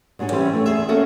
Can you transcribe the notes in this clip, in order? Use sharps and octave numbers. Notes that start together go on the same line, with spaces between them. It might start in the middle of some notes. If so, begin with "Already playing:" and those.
G#2 F#3 D4 C#5 G#5
E3 G3 C4 C#4 E4
A3 C#5
E2 G#4 E5
A#3 C#4 F#4 A4 E5